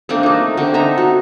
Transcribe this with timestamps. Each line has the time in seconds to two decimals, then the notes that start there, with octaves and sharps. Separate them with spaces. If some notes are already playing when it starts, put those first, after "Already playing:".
0.09 A3 A#3 C4 D4
0.23 A3 D#4
0.57 D3 C4
0.74 D#4 E5 A#5
0.98 F#4